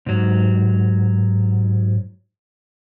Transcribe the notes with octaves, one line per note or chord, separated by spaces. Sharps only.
G#2 F#3